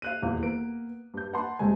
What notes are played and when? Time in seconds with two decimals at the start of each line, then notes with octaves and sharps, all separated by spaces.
0.02 F5 F#6 D#7
0.22 D#1 E2 F5
0.43 A#3 B3 D7
1.14 G2 G6
1.33 B4 F#5 A5 B5 C6
1.59 E1 C3 G#3 A3 G#5